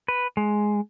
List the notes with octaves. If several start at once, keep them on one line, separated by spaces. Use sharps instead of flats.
B4
G#3